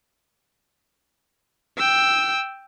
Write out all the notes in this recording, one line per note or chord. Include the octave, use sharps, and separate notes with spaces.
G5 E6